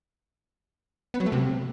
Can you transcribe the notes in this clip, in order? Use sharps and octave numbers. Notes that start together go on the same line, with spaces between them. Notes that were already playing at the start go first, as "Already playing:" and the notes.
B3
F#3
A3
C3